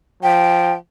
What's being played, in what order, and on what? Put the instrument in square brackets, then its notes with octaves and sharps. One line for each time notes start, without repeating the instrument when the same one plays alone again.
[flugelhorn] F3 [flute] G5